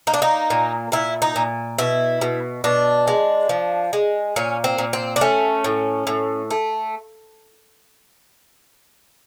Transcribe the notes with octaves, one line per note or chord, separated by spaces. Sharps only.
A#3 D#4
D4
D#4
A#2
A#2 E4
D#4
A#2
B2 E4
B2
B2 D4
G#3
F3
G#3
A#2 C#4
C4
A#2
C4
D4
A3 C#4
A2
A2
A3